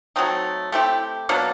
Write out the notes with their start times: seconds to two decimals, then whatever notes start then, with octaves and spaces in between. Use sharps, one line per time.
0.16 F#3 A3 C4 D#4
0.72 A3 C4 E4 G4
1.29 B2 F#3 A#3 D4